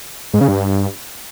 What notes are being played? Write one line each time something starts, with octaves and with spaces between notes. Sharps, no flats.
G#2
C#3
G2